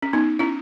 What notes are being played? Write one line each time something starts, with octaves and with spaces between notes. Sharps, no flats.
C#4
B3 D#4
C#4 E4